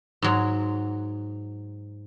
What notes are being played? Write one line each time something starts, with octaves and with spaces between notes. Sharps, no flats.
G#2 F#3